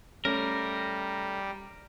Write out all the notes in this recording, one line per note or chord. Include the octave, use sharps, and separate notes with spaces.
G3 A3 C#4 A#4